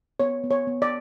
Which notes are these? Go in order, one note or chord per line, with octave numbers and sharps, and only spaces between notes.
B3 C#5
B3
C#5
B3
D5